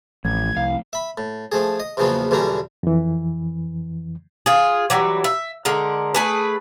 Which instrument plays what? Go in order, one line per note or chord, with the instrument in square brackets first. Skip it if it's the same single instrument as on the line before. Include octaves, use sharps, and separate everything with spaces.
[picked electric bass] A1 [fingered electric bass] F3 A3 [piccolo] G#6
[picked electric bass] C2 [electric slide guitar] F5
[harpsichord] E5 B5
A2
F3 A3 G#4
D#5
A#1 E2 C#3 F3 F#3 B3
B1 E2 D3 G3 C#4 A#5
[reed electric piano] F2 E3
[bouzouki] F4 G#4
E3 F#3 G3
E5
D3 G#3 A#4
A3 G#4 B4